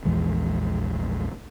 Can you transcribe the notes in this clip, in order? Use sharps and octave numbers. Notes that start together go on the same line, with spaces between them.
A#1 E2 E3 G#3